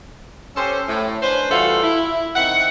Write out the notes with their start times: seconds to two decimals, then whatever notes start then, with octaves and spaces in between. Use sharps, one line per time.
0.56 C#4 G4 A4 C5
0.88 A2
1.22 C#4 D4 B4 C5
1.51 E3 G3 A3 F4 F#4 A4
1.83 E4
2.35 D#3 C4 E4 F#5